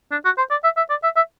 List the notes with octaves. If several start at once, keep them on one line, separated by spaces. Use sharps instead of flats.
D4
F#4
C5
D5
E5
E5
D5
E5
E5